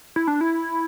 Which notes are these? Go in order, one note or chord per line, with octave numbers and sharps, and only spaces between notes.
E4
D4
E4